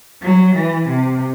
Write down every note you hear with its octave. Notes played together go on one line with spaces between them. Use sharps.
F#3
E3
C3